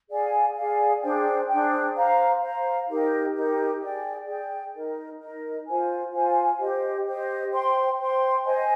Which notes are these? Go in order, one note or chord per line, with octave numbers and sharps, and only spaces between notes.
G#4 D5 F5 G#5
G#4 D5 F5 G#5
D4 G#4 C5 G5
D4 G#4 C5 G5
C5 F5 A#5
C5 F5 A#5
D#4 G4 A#4
D#4 G4 A#4
G#4 D5 G5
G#4 D5 G5
D#4 A#4 D#5
D#4 A#4 D#5
F4 C5 F5 G#5
F4 C5 F5 G#5
G4 C5 D#5
G4 C5 D#5
C5 G5 C6
C5 G5 C6
C5 D#5 G#5